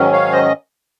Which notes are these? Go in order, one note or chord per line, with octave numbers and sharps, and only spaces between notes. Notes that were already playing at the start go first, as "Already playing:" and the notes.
Already playing: G#2 D#3 F#3 C#4
C#5 F5
C5 D#5